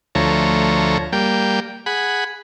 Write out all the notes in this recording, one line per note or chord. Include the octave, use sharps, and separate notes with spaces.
D2 F3 A3 C#5 A#5
G3 A#3 G5
G#4 F#5 B5